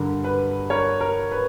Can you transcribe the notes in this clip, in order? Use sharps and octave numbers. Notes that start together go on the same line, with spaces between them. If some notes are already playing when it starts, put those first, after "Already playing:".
Already playing: G2 D3 A#4
B4
A#4 C#5
A#4
B4